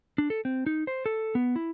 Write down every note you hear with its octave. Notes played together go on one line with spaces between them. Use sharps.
D4
A4
C4
D#4
C5
A4
B3
E4